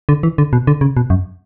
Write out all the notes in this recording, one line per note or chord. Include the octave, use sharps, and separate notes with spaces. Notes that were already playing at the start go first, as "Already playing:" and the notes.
D3
E3
D3
B2
D3
C#3
B2
F#2